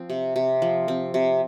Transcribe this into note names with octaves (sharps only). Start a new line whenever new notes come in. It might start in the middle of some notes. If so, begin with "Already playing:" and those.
Already playing: F3 C4
C3
C3
F3
C4
C3